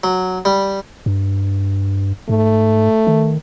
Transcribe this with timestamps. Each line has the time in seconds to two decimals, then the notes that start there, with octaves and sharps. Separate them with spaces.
0.04 F#3
0.45 G3
1.06 G2
2.29 G#2 A3
3.07 D#3